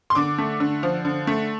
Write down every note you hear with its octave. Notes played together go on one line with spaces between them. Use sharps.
C6
D3 D6
A3
D3
F3
D3
A3